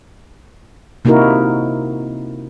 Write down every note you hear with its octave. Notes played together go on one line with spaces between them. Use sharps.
C3 A#3 D#4 E4 F#4 A#4